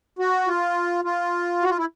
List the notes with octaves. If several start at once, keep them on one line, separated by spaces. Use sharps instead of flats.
F#4
F4
F4
F#4
F4
E4